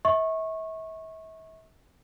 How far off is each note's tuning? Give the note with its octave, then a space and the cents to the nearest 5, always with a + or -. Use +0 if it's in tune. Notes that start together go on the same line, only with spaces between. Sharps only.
E5 -40 C#6 -20